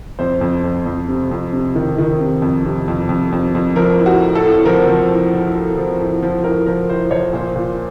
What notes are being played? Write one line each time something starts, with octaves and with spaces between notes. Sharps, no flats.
F2 C5
F2
F2
F2
C3
F2
C3
D#3
D#3
C3
F2
C3
F2
F2
F2
F2
F3 A#4
A2
F#4
A2
A4
A2
F3 A#4
F3
A2
A2
A2
F3
A2
F3
A2 A#4
F3 A#4
A2 C5
F3 C#5
A#2 C5
A#2